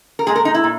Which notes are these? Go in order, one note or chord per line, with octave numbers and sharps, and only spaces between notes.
A#4
A#2 G#3 G#4
A#4
D#4
E4
A#2